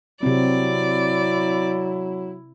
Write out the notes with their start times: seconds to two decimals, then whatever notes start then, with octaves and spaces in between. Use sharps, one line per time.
0.23 C3 F#3 C4 E4 D5